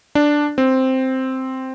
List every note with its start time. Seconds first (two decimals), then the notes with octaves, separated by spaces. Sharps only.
0.15 D4
0.58 C4